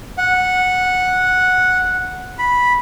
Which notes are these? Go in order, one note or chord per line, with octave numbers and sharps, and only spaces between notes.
F#5
B5